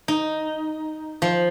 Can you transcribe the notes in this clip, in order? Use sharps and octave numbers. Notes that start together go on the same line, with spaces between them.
D#4
F3